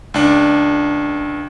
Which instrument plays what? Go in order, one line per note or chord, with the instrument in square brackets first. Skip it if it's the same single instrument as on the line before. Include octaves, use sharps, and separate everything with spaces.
[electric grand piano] C#2 D4